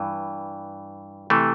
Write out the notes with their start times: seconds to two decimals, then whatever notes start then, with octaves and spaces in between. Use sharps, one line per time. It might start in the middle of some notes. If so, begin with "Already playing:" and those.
Already playing: G2 E3
1.30 C3 E3 A3